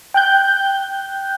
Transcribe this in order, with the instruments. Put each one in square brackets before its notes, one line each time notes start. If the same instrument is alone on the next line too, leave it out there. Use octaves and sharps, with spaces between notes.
[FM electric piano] G5 F#6 G6